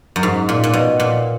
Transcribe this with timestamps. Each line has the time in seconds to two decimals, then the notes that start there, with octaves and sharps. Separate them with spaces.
0.16 F#2
0.23 G#2
0.49 A#2
0.64 A#2
0.74 B2
1.00 A#2